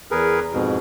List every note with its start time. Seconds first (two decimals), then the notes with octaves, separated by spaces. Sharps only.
0.11 E2 G#4 A#4 B4
0.53 F2 G#2 B2